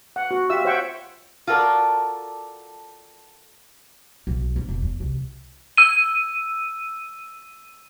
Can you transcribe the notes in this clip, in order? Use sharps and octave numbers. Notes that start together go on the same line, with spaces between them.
F#5
F#4
F4 G4 E5 E6
C5 C#5 E5 F#5 G5 C#6
F4 F#4 A4 A#4 D5
B1
G1
E1
E2
C2
E6 D#7